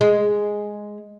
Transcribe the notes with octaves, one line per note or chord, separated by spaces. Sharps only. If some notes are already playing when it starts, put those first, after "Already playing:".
G#3